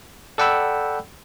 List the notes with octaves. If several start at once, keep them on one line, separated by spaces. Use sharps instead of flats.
A4 D5 F#5 G5 B5 E6